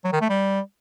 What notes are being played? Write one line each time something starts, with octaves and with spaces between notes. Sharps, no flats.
F#3
D#3
A3
G3